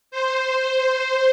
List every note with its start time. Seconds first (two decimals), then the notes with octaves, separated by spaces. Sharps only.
0.11 C5